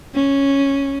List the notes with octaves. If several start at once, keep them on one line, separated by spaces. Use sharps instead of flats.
C#4